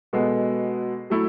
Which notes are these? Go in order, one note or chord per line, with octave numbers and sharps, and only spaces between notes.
B2 G#3 B3 F#4 A4
F#3 A3 E4